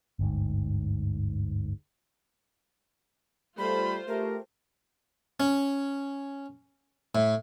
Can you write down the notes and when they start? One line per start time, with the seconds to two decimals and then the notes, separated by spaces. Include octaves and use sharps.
0.19 G1 D2 G#2
3.58 G3 A3 F4 A4 C5 B5
4.08 A3 G4 A#4
5.40 C#4
7.15 A2